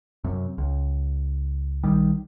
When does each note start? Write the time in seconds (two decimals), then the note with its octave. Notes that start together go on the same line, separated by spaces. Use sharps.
0.24 F#2 C3
0.58 C#2
1.83 B1 D#3 G3